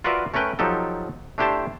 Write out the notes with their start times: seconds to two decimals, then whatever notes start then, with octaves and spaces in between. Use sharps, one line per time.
0.04 F4 F#4 A#4 B4 D5 E5
0.34 A3 C#4 A#4 B4 G5
0.59 F3 F#3 D#4 G4 A4
1.38 A3 D4 E4 G4 C5 A5